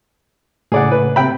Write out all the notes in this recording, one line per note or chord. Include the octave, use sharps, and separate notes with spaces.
A2 C#3 G#4 D5 F#5
B4
C3 G5 B5